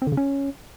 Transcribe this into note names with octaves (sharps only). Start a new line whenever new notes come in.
C4
D3
C#3
C#4